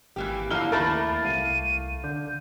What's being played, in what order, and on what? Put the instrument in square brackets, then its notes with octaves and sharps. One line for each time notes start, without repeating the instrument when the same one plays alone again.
[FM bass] G#1 [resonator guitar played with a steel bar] E3 A#3 G4
[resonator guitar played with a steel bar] D3 F3 A#3 [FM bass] E4 [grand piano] F5 G7 [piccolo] F6
[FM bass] D#2 [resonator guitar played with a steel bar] A3 A#3 E4 [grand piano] A#4 A5 B5 [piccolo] A6
[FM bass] C2 [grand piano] F5 [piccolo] D#7
[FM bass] D3 [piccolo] G6